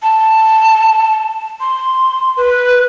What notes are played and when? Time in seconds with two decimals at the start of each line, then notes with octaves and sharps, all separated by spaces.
0.02 A5
1.60 C6
2.37 B4